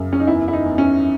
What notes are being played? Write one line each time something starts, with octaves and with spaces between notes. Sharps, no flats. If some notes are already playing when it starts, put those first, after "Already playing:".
Already playing: F#2 C#3
C#4
D#4
E2 E4
E4
D#4
E2
C#4